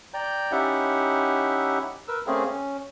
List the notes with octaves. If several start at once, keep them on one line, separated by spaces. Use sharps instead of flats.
D5 G5 A#5 G6
C#4 D#4 E4 G4 E5 F#5
A#4 B4 E6
A3 A#3 C4 C#4 G#4
C#4